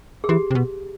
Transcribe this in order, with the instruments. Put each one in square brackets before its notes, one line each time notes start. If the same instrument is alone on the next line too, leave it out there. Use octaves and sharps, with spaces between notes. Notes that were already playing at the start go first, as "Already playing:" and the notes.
[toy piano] G#4
[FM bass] E3 [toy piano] G4
[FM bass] C3
B2